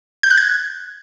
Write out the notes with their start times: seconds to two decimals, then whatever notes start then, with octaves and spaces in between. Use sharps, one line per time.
0.23 G6
0.30 F#6
0.37 G#6